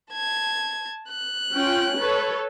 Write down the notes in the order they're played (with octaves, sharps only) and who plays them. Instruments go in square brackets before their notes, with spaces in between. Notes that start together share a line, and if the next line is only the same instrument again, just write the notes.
[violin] A5 G#6
F#6
[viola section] C#4 F4 G5
A4 B4 C#5